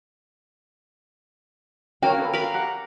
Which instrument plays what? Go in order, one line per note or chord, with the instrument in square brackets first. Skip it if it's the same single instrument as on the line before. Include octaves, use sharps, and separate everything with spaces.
[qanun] A#3 F#4 F5 [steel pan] C#4 A#4 C#5 [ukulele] G5
[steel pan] C#4 A4 B4
[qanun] A#4 F5 B5
[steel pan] G4 F#5 A#5